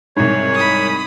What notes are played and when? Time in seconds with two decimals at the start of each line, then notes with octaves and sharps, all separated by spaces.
0.17 C2 G#2 C#5
0.55 B5 D#6